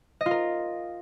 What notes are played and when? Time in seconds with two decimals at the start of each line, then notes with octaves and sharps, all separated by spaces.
0.21 D#5
0.26 F4
0.31 A#4